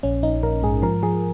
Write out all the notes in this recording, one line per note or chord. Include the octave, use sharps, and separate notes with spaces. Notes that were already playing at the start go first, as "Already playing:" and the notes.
A#1 C#4
A#1 D#4
A#1 A#4
G#2 G#4
F3 A#4
F3 G#4